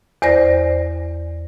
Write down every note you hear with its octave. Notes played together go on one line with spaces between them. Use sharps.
E2 C5 D5 A#6